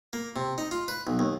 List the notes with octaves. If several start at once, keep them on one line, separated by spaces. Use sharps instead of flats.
A#3
C3
D#4
F4
B4
B1
D#2